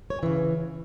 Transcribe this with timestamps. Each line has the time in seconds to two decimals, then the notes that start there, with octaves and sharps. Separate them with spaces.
0.10 C#5
0.23 C#3 E3